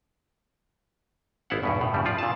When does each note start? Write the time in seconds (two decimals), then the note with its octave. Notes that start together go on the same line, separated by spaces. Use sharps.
1.50 G#1 B3 E4 C5 F5 F#5
1.63 E2 G2 B2
1.81 A2
1.94 G2 C#3 G3
2.05 F3 F4 D5
2.19 A#2 A5